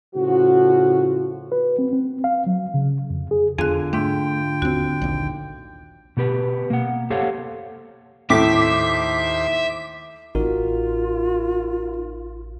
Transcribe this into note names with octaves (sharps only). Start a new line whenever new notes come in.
A2 C#3 F3 F#4
B4
C4
C4
F5
F#3
C#3
F2
G#4
E2 D3 F4 G#4 G#5 F#6
G#2 A3 D4 G5
D#2 C4 F#4
A#1 D#2
B2 B3 G4 B4
A#3 F#5
G4 A4 C5 C#5 F5 F#5
D#2 A2 C5 E5 D6 B6
A1 D#4 F4 F#4 A#4